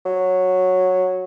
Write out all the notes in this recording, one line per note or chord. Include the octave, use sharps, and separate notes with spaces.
F#3